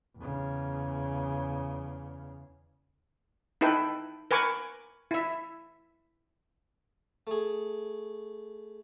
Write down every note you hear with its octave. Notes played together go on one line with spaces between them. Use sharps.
E2 C#3
D#4 E4 A4 B4 G5
A#4 B4 G#5 C#6 D6
E4 E5
A3 G#4